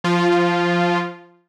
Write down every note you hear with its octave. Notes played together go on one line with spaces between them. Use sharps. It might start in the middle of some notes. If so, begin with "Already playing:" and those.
F3 F4